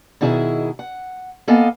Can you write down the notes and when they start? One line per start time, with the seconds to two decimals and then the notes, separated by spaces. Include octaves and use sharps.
0.21 B2 D#3 E4 G#4 D5 E5
0.79 F#5
1.48 A#3 B3 A4 D#5 F5 G#5